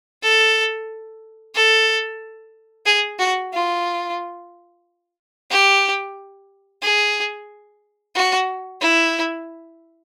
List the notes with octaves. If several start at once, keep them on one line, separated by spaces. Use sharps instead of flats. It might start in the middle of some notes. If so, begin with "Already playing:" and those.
A4
A4
G#4
F#4
F4
G4
G#4
F#4
E4